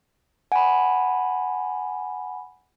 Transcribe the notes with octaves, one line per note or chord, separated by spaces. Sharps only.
F#5 G#5 B5